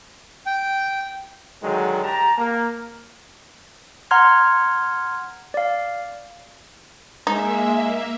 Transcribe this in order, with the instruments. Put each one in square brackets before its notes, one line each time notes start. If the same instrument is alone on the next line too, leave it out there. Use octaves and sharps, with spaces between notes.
[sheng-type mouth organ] G5
[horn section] D3 D#3 F#3 G#3
G4 A5 A#5
A#3
[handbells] F#5 A#5 C6 F6 G#6
D5 F5
[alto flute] G#3 [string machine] A#3 E5 [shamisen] D#4